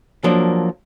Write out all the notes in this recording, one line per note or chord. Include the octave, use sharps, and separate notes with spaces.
F3 F#3 A#3 D4